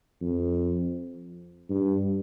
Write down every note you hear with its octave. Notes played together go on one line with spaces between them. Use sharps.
F2
G2